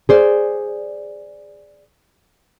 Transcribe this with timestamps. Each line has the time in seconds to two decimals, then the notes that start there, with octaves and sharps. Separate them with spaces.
0.09 G#4 C5 D5